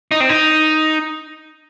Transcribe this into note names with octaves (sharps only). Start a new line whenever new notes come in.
D#4
C4
D#4